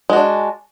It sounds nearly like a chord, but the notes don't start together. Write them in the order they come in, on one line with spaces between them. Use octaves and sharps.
G#3 F#4 D4